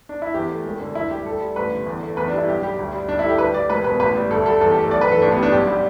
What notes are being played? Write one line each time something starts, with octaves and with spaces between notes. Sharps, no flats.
D4
E4
E2 G4
A3
E1
D3
D2 E4
G3 G4
D2 A4
G3
A1 B4
D3
E2
A3
E2 B4
D4
G3
E4
B1 G4
G3 G4
D2
G3
D2 D4
E4
G3 A4
G4
D2 B4
G3 D5
E1 B4
B2 B4
A1 B4
G3
D2 A4
G3 A4
E2 A4
G4
A3
A4
B1 D5
B4
E3 A4
A1 D4
B3
G3
D4
B1 G4
G3